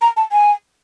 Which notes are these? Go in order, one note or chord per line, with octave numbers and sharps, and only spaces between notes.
A#5
A5
G#5